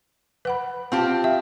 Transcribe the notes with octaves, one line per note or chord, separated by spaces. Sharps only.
B4 F#5 B5
C4 F4 G4
E5